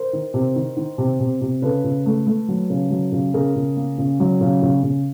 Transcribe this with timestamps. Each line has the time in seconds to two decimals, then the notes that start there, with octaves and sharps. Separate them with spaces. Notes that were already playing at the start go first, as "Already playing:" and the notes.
Already playing: A#4 C5
0.13 D#3
0.34 C3
0.56 D#3
0.77 D#3
0.98 C3
1.20 C3
1.41 C3
1.62 C#3 A4 B4
1.84 C#3
2.06 A3
2.27 A3
2.48 F#3
2.70 C#3
2.90 F#3
3.12 C#3
3.34 C#3 G#4 A#4
3.56 C#3
3.76 A#3
3.98 C#3
4.20 F#3
4.41 C#3
4.62 C#3
4.83 C#3